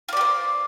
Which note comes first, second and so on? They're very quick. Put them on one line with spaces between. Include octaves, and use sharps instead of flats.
F4 D5 G4 C5